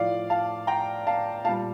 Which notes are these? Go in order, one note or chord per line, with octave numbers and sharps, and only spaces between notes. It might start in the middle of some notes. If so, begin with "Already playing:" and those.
Already playing: A2 F3 D5 F5
F5 A5
G5 A#5
F5 A5
A#2 G3 F5 A5